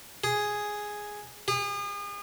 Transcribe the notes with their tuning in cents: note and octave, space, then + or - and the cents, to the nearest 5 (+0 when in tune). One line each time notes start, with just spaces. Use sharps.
G#4 +0
G#4 -40